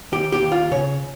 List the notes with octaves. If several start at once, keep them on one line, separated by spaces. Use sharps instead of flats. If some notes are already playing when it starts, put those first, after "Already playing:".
D#2 G4
G4
D#2
F4
C#3 C#5